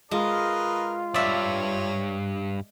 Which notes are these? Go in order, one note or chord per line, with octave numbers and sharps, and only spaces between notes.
G#3 F4 A#4 B4 D#5
C2 G2 C#5 D5 E5